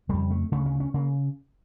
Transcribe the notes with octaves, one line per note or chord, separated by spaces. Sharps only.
F2 C#3 G3
A3
D2 C#3 A3
C#4
C#4
C#3 A#3